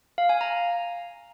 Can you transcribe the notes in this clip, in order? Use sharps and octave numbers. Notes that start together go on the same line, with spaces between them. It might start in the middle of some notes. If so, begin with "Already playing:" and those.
F5
G#5
A#5